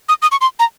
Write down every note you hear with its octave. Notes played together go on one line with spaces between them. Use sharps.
D#6
D#6
C#6
C6
A#5